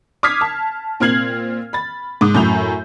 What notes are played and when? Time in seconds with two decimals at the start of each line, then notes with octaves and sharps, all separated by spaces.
0.23 D6 D#6 F6 G#6 B6 C7
0.41 A5
1.00 A#2 C4 F6 G#6 C7 F#7
1.73 B5 A6
2.21 G#2 D6 D#6
2.35 F#2 A2 G6 F7